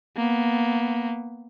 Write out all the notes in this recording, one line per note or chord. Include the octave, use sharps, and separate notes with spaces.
A#3 B3